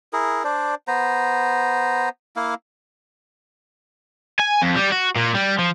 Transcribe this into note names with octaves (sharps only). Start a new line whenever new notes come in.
E4 G#4 A#4
D4 C5 D5
B3 C5 A#5
A#3 E4 F5
G#5
F2
G3
F#4
A#2
G3
F3